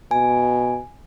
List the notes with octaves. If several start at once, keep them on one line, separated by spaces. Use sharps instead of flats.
B2 G#5